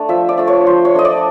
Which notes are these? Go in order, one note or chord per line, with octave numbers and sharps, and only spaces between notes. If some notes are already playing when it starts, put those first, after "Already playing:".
Already playing: A3 D4
F3 E5
D5
A3 D4
C#5
F3 C5
C#5
A3 D4 D#5
D5